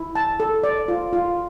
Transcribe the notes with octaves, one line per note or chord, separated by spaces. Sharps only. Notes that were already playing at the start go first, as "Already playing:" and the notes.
Already playing: E4
A5
A4
D5
F4
F4